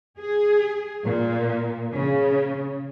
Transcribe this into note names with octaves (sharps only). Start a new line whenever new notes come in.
G#4
A#2
C#3